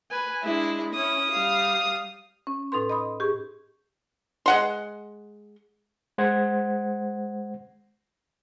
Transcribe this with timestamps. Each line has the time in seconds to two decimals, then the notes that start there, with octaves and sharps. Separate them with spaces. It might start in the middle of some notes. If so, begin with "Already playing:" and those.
0.10 B4 G#5
0.43 G#3 D4 E4
0.95 C#4 E4 D#6
1.32 G3 F5
2.47 C#4
2.72 A2 D#4 A4 B4 C6
2.90 D#5 B5 C6 D#6
3.20 G4 G#4 C#6
4.46 G#3 F#5 C6
6.18 G#3 C5 F#5 G#6